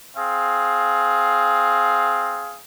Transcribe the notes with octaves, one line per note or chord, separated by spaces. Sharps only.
C4 G#4 F5